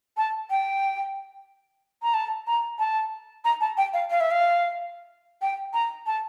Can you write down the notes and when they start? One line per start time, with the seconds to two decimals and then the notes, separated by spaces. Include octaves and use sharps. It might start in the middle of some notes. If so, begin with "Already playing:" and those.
0.17 A5
0.50 G5
2.03 A#5
2.14 A5
2.47 A#5
2.79 A5
3.45 A#5
3.61 A5
3.77 G5
3.93 F5
4.10 F5
4.20 E5
4.31 F5
5.42 G5
5.74 A#5
6.07 A5